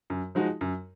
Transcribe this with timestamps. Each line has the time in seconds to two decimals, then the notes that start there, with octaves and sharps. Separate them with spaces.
0.10 F#2
0.35 F3 G#3 D#4 F#4
0.61 F#2